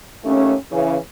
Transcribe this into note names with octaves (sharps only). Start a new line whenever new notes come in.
D#2 A3 C#4
C#3 E3